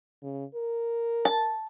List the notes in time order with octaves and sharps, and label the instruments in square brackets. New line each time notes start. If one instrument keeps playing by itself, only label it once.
[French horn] C#3
A#4
[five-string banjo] A5